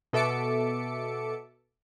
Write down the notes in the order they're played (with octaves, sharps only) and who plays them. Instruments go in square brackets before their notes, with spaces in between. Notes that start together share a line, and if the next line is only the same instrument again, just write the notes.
[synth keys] B2 A4 E5 D6 C#7